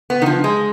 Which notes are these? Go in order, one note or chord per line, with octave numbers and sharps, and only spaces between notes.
B3
D#3
F3
G#3